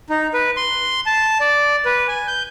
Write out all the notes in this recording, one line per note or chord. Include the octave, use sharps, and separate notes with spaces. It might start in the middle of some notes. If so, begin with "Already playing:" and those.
D#4
B4
C6
A5
D5
B4
G#5
G6